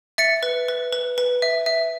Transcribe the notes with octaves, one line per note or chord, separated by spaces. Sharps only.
E5 A6 C#7
B4
B4
B4
B4
E5
E5